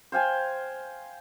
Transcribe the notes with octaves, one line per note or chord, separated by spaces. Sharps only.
C5 F5 G5 G#5